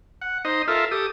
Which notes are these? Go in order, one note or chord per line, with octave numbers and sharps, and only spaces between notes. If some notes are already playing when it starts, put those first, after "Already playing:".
F#5
D#4 C5 D#5
F4 A4 A#4 E5
G4 A4 D#6